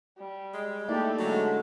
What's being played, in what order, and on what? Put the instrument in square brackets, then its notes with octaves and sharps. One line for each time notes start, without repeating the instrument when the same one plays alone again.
[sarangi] G3
[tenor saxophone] G#3
[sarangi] A3 [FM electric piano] A#3 D#4 E4 [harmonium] G4 D5
[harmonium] D3 G#3 [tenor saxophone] F#3